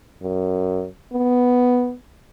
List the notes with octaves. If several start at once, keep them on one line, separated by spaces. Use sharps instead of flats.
F#2
B3